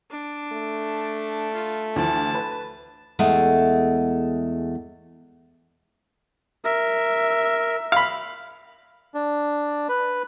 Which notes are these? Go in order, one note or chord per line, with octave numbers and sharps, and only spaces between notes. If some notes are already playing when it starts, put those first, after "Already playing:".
D4
A3
F4
D2 E3 F3 A5
B4
E2 G#3 A3
A#4 E5
F5 B5
D4
B4